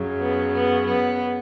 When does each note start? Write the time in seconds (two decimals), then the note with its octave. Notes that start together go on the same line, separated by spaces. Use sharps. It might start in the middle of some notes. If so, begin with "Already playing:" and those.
Already playing: F#2 C#3 F#3
0.20 B3
0.53 B3
0.86 B3